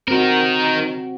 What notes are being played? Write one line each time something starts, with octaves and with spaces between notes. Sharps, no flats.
C4 D#4 F#4 A#4